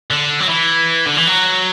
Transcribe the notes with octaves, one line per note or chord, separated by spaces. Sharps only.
D3
F#3
E3
D3
E3
F#3